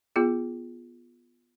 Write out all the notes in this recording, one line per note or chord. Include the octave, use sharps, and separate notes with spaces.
B3 F4 G#4